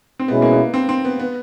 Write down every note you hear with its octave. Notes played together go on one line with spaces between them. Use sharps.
C4
B2 G#3 B3 C#4 E4
A#3
B3
C4
C4
B3
B3